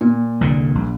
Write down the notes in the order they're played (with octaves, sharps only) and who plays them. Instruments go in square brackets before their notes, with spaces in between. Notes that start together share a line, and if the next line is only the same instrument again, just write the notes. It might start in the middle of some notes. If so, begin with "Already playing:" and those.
[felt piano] A#2
[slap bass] C2 F2 D3
A#1